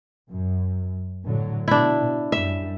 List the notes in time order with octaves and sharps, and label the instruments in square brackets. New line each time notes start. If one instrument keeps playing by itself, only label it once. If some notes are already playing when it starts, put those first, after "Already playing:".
[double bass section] F#2
A2 D3 F#3
[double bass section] B2 [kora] D4 E4
[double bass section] F#2 G3 [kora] E5